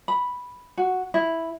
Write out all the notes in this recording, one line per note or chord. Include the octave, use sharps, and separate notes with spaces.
B5
F#4
E4